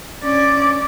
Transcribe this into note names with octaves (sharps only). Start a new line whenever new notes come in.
C#4 D5